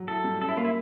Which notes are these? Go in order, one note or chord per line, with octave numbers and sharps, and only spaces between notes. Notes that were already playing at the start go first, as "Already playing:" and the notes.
Already playing: F#3
E4 A4
G3
C#4 A4
E4
A#3 F4
E4